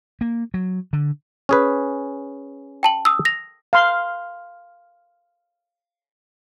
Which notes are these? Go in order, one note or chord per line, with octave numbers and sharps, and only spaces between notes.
A#3
F#3
D3
C#4 G#4 B4
G5 A5 F#7
D#6 E6
A#6 F7
F5 C6